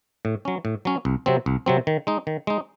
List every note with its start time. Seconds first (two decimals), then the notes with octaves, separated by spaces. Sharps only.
0.25 A2
0.45 F#3 C#4
0.65 A2
0.85 F#3 C#4
1.05 C2
1.26 C3 F#3 C4
1.46 C2
1.66 C3 F#3 C4
1.87 D#3
2.07 G#3 D#4
2.27 D#3
2.47 G#3 D#4